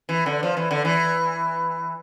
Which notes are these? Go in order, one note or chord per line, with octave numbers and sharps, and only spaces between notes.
E3
D3
F3
E3
D3
E3